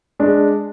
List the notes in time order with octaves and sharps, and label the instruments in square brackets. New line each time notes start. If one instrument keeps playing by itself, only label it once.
[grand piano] G#3 D4